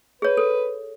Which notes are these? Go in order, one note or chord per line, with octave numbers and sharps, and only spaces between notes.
G#4 B4 C#5
A4